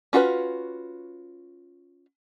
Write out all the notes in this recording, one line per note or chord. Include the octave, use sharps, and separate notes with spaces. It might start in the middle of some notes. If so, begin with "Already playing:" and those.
C#4 F4 F#4 A#4 B4